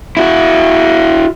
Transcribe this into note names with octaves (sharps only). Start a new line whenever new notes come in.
E4 F#4